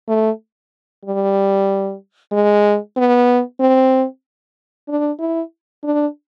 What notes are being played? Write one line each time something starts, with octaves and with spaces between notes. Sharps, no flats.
A3
G3
G#3
B3
C4
D4
E4
D4